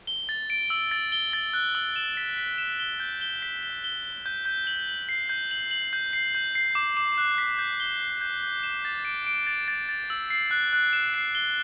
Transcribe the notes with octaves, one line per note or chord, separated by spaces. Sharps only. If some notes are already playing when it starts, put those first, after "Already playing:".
G7
A6
D7
E6
A6
G7
A6
F#6
E6
E7
B6
B6
E7
G7
G6
G7
B6
G7
G7
G7
G6
G6
F#7
F#7
C7
G6
F#7
F#7
G6
C7
G6
C7
D6
D6
F#6
B6
G6
G7
C7
G6
G6
E7
A6
D7
D7
A6
A6
A6
E6
C7
F#6
F#6
E7
C7
G7